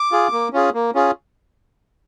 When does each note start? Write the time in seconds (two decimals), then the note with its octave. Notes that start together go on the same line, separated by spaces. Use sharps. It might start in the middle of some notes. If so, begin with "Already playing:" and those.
Already playing: D6
0.12 F4 G#4
0.32 A#3
0.53 C#4 F4 G#4
0.74 A#3
0.95 C#4 F4 G#4